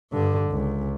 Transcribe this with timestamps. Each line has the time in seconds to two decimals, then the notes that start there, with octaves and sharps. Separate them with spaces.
0.12 G2 D3
0.51 C#2